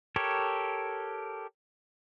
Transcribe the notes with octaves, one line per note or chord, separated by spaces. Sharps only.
G4 A4 A#4 C#5